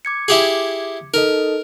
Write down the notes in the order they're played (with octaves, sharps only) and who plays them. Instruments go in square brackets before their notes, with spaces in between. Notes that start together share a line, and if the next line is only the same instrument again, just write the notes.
[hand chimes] D6 G#6 C#7
[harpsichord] E4 G4 G#4
[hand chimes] D#4 A4 D#5 [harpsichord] A#4